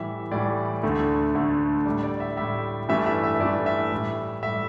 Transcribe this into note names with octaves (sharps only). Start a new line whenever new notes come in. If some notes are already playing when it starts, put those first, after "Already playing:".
Already playing: A2 E3 G3 E5
A2 E3 G3 D5
D2 D3 A3
D2 D3 A3
A2 G3 D5
D5
E5
A2 G3 E5
G2 E3 A3 E5
E5
E5
G2 E3 A3 D5
E5
A2 G3
A2 G3 E5